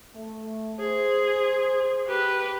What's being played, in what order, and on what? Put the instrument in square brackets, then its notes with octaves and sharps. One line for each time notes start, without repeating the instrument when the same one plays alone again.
[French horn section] A3
[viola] G#4 [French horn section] C5
[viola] G4 B4